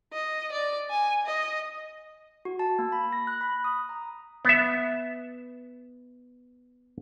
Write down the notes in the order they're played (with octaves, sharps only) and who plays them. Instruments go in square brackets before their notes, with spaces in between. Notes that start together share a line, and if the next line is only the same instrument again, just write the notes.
[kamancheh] D#5
D5
G#5
D#5
[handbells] F#4
A5
A#3
B5
A#6
F#6
B5
D#6
A#5
[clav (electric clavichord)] B3 E5